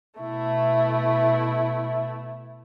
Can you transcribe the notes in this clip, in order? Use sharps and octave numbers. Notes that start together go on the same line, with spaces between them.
B2 A3 E4